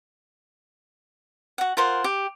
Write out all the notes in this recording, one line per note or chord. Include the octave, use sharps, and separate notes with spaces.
F#4 F#5
F4 A#4 C5 F#5
G4